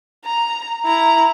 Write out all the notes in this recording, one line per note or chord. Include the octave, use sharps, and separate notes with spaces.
A#5
E4 A#5